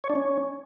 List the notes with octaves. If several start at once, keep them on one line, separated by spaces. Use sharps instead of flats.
C#5
D4
C#4